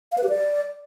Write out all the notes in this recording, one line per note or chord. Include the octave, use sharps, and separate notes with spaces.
F5
B4
G4
D5